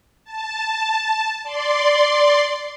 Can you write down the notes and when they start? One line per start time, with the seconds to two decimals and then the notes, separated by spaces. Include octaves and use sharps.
0.24 A5
1.43 D5 C6